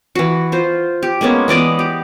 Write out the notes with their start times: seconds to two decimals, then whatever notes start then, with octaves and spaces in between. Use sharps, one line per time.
0.15 E3 F#4
0.52 F4 C5
1.03 G4
1.21 G#3 A#3 B3 C#4
1.48 E3 B3 D5 D#5
1.79 G4